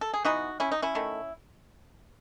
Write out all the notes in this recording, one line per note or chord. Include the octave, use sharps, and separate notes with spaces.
A4
G#4
E3 B3 D#4 F#4
C#4 E4
D#4
C#4 E4
D#3 A3